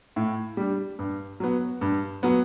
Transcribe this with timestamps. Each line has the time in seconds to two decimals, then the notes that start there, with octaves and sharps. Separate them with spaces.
0.16 A2
0.57 G3 D4
0.99 G2
1.40 F#3 B3
1.81 G2
2.23 F#3 B3